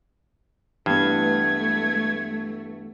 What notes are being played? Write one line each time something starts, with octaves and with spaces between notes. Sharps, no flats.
G2 E3 A3 B3 G#6